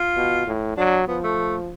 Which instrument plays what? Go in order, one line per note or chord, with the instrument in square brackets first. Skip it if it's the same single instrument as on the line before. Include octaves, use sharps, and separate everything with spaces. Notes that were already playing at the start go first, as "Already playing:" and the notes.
Already playing: [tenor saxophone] F4
[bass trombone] B2
A2
[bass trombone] F#3 [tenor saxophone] D4
[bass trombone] F3 [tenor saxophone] B3
[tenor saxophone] A3